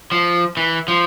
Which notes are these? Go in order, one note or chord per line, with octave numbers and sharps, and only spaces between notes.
F3
E3
F3